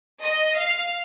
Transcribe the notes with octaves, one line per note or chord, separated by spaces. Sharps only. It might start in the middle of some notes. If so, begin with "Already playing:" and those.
D#5
F5